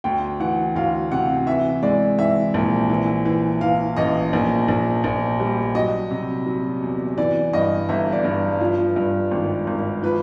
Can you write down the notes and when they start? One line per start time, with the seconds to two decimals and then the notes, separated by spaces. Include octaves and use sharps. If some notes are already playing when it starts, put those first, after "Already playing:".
0.04 D2 G5
0.40 E3 F#5
0.75 D2 F5
1.11 C3 F#5
1.47 E3 E5
1.82 G#3 D5
2.18 E3 E5
2.54 A#1
2.90 E3
3.25 E3
3.61 E3 F5
3.96 A1 D#5
4.33 A#1
4.68 A#1
5.04 A#1
5.40 G3
5.75 F#3 D#5
6.11 C3
6.46 F#3
6.82 E2
7.18 E3 D5
7.53 G2 D#5
7.89 G1 E5
8.12 D5
8.24 G2
8.61 F3
8.96 G2
9.31 G#1
9.67 G#1
10.03 F3 B4